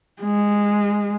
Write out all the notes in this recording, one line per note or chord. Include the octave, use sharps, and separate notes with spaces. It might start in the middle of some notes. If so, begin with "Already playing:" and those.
G#3